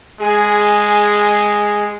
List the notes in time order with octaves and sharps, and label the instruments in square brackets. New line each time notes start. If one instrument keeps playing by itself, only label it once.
[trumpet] G#3 [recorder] G#4